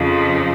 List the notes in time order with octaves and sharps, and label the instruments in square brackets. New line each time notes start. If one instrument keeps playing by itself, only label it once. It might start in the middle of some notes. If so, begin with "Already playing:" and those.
Already playing: [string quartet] F2 C#3 F3